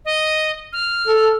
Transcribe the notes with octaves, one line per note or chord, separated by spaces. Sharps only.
D#5
F6
A4